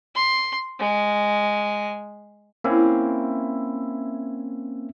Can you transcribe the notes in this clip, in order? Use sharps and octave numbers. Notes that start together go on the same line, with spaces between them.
C6
G#3
A#3 C4 C#4 E4